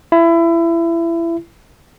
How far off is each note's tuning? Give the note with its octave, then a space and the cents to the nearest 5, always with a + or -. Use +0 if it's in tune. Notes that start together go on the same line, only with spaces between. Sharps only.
E4 +25